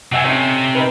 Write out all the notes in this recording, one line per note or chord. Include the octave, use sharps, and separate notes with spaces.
C3 F#3 F#4 E5 G#5
C3 A3 C#4 D#4
D#4 A#4 B4